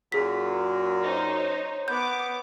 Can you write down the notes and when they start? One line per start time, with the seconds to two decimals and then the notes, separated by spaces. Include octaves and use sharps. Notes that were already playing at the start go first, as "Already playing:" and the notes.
0.12 F#2 A#2 F#3 G#4 B6
1.02 D#4 C5 C#5
1.88 B3 D6 G6